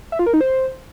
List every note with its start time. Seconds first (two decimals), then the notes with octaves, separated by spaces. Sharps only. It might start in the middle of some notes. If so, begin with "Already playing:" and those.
0.12 E5
0.19 F4
0.26 A#4
0.33 D#4
0.41 C5